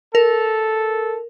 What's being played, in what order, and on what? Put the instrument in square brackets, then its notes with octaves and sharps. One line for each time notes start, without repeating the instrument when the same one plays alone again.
[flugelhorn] A4 [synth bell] A#4